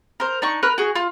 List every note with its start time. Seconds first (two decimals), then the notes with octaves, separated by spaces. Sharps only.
0.20 A#4 C5
0.42 D4 D#4 C#6
0.63 A#4 B4 F#6
0.78 F#4 G#4
0.95 F4